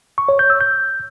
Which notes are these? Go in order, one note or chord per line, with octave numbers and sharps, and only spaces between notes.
C#6
C#5
G6
E6
G6